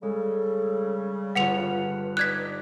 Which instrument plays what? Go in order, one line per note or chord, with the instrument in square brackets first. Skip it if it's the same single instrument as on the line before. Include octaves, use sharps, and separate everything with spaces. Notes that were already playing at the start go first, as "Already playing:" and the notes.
[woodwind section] C#3 G3 [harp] G#3 [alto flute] A4
[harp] G1 F4 [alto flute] B4 [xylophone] F#5 C#7 F7
[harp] D#4 D5 [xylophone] F#6 G#6 B6